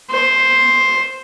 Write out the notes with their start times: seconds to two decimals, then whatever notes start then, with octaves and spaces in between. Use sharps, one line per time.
0.11 C5